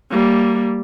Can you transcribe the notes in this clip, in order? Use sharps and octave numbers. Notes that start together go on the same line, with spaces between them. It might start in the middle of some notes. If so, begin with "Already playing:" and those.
G3 A#3